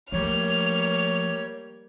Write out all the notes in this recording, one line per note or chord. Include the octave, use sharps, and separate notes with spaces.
F3 G3 A3 A#3 C#5 F6